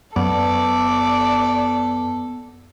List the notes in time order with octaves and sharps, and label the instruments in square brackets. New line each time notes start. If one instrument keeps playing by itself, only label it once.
[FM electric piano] F#2 [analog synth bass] B3 [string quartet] A4 [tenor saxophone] D5